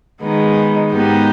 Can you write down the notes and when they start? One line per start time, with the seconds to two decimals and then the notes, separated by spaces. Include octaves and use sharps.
0.22 D#3 G#3 B3 D#4
0.91 G#2 D#3 B3 D#4 G4